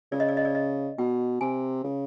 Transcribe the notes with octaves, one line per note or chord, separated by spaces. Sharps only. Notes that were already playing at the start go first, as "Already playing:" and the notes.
C#3 D5
D#5
D5
D#5
D5
D#5
B2 G5
C3 G#5
C#3